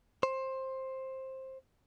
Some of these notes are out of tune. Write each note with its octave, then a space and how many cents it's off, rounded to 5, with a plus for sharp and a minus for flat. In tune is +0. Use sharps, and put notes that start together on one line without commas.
C5 +15